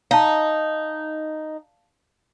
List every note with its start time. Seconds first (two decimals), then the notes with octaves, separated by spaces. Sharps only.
0.11 D#4 F5 A5